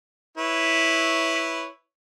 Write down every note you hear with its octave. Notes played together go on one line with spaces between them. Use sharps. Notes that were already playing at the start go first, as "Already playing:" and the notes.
E4 B4 C#5